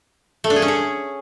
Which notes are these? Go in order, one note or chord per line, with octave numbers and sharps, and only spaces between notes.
A3
D4
G#4
C#4
C#5